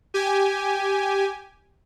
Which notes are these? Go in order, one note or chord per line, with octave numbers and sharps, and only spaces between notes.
G4 G#5